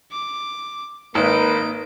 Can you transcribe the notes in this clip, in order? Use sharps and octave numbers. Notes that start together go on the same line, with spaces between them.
D6
G#1 A#3 D#4 B4 D7